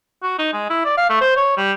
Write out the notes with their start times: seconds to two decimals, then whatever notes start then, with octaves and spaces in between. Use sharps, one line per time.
0.23 F#4
0.38 D#4
0.53 G#3
0.70 E4
0.85 D5
0.97 F5
1.09 A3
1.21 C5
1.36 C#5
1.57 G3